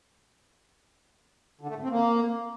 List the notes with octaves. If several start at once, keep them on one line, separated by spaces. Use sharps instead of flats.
D3
A3
A2
C4
A#3